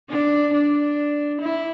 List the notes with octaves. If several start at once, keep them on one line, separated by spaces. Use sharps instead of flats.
D4
D4
E4